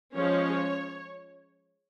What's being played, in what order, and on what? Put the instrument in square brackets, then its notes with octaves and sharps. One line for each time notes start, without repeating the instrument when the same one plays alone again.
[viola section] F3 G#3 C#4 C#5